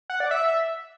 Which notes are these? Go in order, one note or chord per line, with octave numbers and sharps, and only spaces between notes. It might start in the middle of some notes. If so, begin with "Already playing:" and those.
F#5
D5
E5